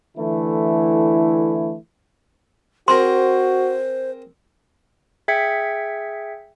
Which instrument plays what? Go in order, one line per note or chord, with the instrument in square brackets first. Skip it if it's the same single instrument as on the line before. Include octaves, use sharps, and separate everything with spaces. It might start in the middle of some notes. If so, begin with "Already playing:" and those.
[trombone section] D3 E3 A3 E4
[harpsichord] C4 G#4 A#4 [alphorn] F#4 [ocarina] C5 [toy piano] C6
[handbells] G#4 E5 G5 G#6 B6 C#7